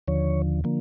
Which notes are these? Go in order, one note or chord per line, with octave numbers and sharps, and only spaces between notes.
D#2 D3 F3 C#5
D3 F3 A#3